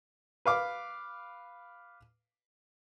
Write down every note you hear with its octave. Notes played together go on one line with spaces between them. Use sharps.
B4 F5 D6